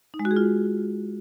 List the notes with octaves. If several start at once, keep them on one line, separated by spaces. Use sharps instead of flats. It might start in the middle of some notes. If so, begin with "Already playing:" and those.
D#4
G#3
F#4
G#4
F4